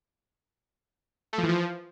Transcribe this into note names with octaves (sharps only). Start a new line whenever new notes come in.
A3
F3
E3
F3